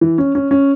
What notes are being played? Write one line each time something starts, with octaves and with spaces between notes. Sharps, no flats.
E3
C#4
C#4
C#4